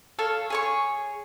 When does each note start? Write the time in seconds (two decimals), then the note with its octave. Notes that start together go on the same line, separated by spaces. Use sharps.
0.19 A4 C#5 F5
0.50 G#4 C#5 C#6